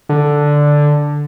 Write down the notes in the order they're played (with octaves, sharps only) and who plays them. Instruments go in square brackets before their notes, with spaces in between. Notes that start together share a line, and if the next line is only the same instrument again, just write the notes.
[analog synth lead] D3